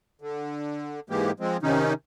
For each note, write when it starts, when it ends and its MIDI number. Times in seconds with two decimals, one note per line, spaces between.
0.22 1.00 50
1.10 1.31 44
1.10 1.31 52
1.10 1.31 56
1.10 1.31 58
1.10 1.31 67
1.40 1.57 53
1.40 1.57 56
1.40 1.57 60
1.63 1.93 48
1.63 1.93 51
1.63 1.93 61
1.63 1.93 63